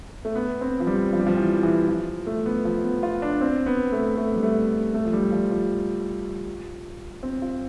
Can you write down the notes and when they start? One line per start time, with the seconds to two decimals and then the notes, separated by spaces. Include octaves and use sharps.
0.25 A3
0.36 B3
0.61 C4
0.80 F3
0.87 G3
1.13 F3
1.20 G3
1.27 F3
1.37 E3
1.63 E3
1.89 F3
2.27 A3
2.46 B3
2.65 F3
2.84 B3
3.03 F4
3.22 D4
3.41 C4
3.66 B3
3.92 A3
4.17 A3
4.36 G3
4.43 A3
4.94 A3
5.05 F3
5.13 G3
5.32 F3
5.51 F3
7.23 C4
7.42 F4